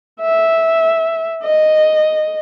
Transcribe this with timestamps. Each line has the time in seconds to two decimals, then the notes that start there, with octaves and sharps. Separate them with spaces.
0.22 E5
1.43 D#5